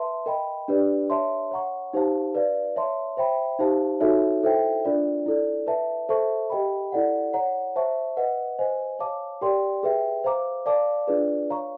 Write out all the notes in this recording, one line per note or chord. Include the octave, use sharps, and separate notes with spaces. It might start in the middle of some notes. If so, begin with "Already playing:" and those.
Already playing: B4 E5 A5 C6
A#4 D#5 G5 B5
D4 G4 B4 D5
C#5 E5 A5 C6
C#5 F#5 A#5 C#6
D#4 G4 C5 F5 A5
B4 D5 F5
C#5 E5 A5 C6
C5 E5 G5 B5
D#4 G4 C5 F5 A5
D#4 F#4 A4 C#5 E5
E4 A4 C5 E5 G5
D4 F4 A#4 D5
E4 A4 D5
B4 E5 A5
A4 C5 E5 A5 C#6
G4 A#4 D#5 G5 B5
E4 A4 D5 F#5
C#5 F#5 A#5
C5 E5 A5 C#6
B4 D#5 F#5
C5 D#5 G#5
C#5 F5 A5 D6
G4 A#4 D5 G5 C6
G#4 B4 E5 G5
C5 F5 A#5 D6
A#4 D5 F5 A5 D6
D4 F4 G#4 B4 D5
C#5 F5 A#5 C#6